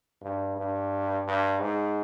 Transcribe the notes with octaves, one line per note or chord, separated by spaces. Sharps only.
G2
G2
G2
G#2